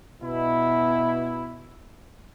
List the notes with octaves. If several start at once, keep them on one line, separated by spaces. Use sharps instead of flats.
B2 E4